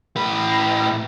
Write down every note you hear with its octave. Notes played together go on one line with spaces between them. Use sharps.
A2 B4